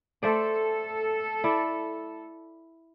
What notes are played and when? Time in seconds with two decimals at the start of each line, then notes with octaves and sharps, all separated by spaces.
0.23 A3 A4 C5 D5
1.44 E4 D5